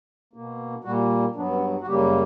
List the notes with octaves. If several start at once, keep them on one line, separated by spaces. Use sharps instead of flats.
B2 A#3
A#2 G3 A#3 F#4
G2 F#3 B3 D4
C#4
B3
F#4
F#2 C#3 G3 A#3 G4